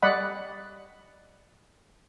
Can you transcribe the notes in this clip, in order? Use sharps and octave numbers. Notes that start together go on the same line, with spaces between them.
G3 D5 D#5 F#5 B5